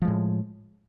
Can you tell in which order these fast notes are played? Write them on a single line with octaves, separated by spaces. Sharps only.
F3 G#3 A2